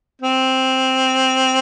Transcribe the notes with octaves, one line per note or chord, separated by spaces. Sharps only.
C4